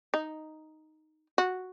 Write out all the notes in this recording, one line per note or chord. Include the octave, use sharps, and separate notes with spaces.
D#4
F#4